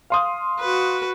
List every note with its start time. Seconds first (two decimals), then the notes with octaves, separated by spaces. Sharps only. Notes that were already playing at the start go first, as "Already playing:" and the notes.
0.10 F5 C6 D#6
0.60 F#4 B4